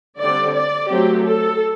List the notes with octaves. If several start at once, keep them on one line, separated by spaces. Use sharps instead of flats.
D3 G3 C4 D5
D5
F#3 A3 C4 G4
A4